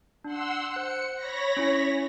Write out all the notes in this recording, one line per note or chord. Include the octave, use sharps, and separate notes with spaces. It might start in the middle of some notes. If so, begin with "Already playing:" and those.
D4 F#5 C6 E6
C5 F#6 C#7
C#5 B5 A#6
C#4 E4 G#5